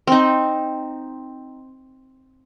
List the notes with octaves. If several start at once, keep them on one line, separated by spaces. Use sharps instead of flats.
C4 D#4